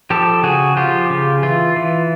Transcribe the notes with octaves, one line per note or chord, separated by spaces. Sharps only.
F3 G4 A4
C#3 F#4 G#4
F3 F4 G4
C#3
E3 F4
E3